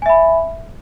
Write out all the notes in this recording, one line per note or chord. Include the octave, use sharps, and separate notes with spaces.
E5 G#5 B5